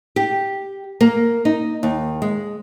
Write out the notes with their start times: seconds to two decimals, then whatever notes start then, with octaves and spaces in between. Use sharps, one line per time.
0.16 G4
1.01 A#3
1.45 D#4
1.83 D#2
2.22 G#3